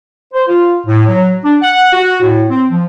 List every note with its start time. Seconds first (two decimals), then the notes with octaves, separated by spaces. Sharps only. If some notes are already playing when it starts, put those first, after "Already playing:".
0.33 C5
0.48 F4
0.86 A2
1.07 F#3
1.44 D4
1.62 F#5
1.93 F#4
2.22 A2
2.49 C4
2.70 F3